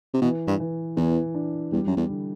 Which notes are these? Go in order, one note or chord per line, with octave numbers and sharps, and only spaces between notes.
C3
B2 E3
G2
E3
E2 E3
D4
E2 G3
F#2
E2
D3